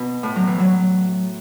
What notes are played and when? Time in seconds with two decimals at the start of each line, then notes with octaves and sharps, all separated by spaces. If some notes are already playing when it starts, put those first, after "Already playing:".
Already playing: B2
0.23 A2
0.36 F#3
0.47 E3
0.60 F#3